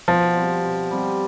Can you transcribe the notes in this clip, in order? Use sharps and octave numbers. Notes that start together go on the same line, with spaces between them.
B2 F3
G3 C4
B2
G3 C4